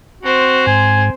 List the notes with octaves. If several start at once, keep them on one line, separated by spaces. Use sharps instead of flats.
C4 F#4 C5
G#2 G#5